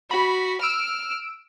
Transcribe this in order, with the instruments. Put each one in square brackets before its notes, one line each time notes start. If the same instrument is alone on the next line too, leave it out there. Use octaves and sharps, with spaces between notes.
[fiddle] F#4 [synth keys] B5
[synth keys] E6 D7 E7 [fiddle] F6